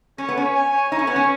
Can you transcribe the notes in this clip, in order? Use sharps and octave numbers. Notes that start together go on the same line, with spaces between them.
C#4 C#5
B3
C#4 C#5
G#5
C#5
D#4 C#5
C#4
B3 C#5
C#4